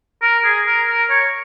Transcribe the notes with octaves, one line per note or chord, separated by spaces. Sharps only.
A#4
G#4
A#4
A#4
C#5